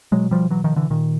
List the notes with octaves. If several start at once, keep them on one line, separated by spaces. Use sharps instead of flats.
B2 F#3 G#3
F3 G3
E3 F#3
D#3 F3
D3 E3
A#2 D#3